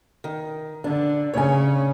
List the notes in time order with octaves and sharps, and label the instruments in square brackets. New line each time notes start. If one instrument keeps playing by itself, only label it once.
[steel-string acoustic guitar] D#3
[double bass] D3 [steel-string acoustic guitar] D4
[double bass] C#3 [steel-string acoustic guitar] C#5 G#5